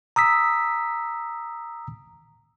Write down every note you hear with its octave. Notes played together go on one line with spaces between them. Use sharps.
A#5 D#6 E6 B6